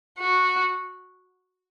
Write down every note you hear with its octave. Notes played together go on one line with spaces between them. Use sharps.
F#4